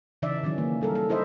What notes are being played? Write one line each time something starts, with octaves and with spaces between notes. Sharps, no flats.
C#3 E3 D4 D#4 D5 E5
D#3 E3 F#3 C#4
A#3
G3 A4 A#4
A4
D#4 E4 C5 D#5 E5